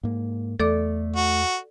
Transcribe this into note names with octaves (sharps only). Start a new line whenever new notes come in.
G#2 A#3
E2 A3 A4 D5 D6
F#4